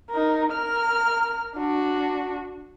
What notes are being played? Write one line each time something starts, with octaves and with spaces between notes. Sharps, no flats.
D#4 A#4
A#4 F6
D4 F#4